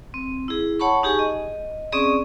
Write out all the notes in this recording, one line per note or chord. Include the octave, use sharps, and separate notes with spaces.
C4
E4 G#4
C#5 F#5 A5 B5 C#6
D#4 G4 G#4 G#5 C#6
D#5
C4 C#4 G#4 D5 C#6 D#6